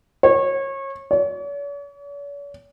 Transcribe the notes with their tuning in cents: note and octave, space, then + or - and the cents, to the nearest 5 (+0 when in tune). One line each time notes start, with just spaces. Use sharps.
C#5 -30
C#5 +45